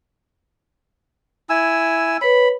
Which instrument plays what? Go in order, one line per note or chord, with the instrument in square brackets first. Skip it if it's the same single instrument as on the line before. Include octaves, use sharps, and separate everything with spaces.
[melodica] E4 G#5 E6
[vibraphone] B4 C#5 [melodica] B5